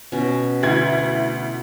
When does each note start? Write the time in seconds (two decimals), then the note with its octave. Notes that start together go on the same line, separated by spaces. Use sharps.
0.12 B2 C#4
0.63 D2 E4 G#6